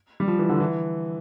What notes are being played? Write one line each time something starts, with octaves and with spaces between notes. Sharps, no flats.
G3
F3
E3
D3
E3